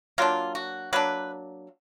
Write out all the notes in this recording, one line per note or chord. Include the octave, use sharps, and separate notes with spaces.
F#3 A#3 D4 F4
F#4
F#3 A#3 D4 B4